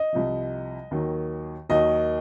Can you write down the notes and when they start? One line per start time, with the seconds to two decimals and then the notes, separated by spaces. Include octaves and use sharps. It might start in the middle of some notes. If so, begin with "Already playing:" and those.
Already playing: D#5
0.13 C2 C3 F3
0.91 D#2 D#3 F#3
1.69 D#2 D#3 F#3 D#5